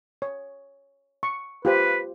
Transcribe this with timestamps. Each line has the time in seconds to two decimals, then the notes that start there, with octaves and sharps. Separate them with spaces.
0.22 C#5
1.23 C#6
1.65 F4 G4 B4 C5